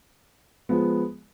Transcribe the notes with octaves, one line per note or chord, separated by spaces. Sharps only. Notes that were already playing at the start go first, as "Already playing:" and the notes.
F3 G#3 B3